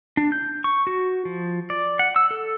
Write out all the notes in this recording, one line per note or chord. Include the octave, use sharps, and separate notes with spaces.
D4
G6
C#6
F#4
F3
D5
F#5
E6
A4